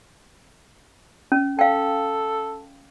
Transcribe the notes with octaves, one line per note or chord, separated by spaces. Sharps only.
C#4
A4 F5 G5